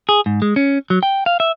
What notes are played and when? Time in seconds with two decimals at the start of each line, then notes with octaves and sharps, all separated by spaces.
0.09 G#4
0.26 G#2
0.42 G#3
0.56 C#4
0.90 F#3
1.03 G5
1.26 F5
1.40 E5